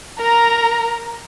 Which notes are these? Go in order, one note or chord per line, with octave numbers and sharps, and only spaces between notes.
A#4 A#5